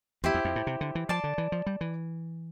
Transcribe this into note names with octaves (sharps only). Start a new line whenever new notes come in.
E2 E4 G4 C5
E2
F2
A2
C3
D3
E3
F3 D5 A5 C6
D3
E3
F3
G3
E3